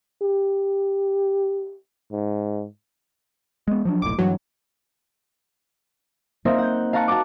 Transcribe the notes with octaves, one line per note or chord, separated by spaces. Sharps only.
G4
G#2
G#3 B3
F3 F#3 D4
F1 B1 A2 D6
G2 E3 F#3
A#3 C4 D#4 A#4 E5 F5
F#5 G6
F5 A5 A#5 C#6 F#6 C#7
F#4 F#5 A5 A#5 D6